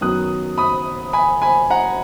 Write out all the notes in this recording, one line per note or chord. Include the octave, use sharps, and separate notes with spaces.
F#2 D#3 F#3 B3 D#6 F#6
B5 D#6
G#5 B5
G#5 B5
F#5 A#5